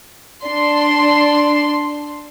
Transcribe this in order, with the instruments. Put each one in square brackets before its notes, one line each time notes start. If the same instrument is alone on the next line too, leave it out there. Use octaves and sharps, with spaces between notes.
[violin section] D4 C6